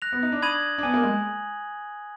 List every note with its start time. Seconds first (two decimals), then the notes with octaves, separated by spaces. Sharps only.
0.02 F#6 A#6 F7
0.12 B3
0.23 D#4
0.32 D4
0.42 B5 D#6 G#6 D#7 F#7
0.78 D4
0.83 B3 G#5 D#6 G#6
0.94 A#3
1.03 G#3